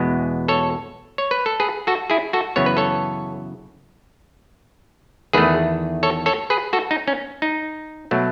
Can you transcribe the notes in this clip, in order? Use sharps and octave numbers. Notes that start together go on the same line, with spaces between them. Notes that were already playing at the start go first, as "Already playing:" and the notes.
Already playing: E2 B2 G#3 B3
A4 C#5
C#5
B4
A4
G#4 B4
F#4 A4
E4 G#4
F#4 A4
F#2 C#3 E3 B3 C#5
B4
A4 C#5
E2 D#3 A3 G#4 B4
A4 C#5
A4 C#5
G#4 B4
F#4 A4
D#4
C#4
D#4
B2 F#3 A3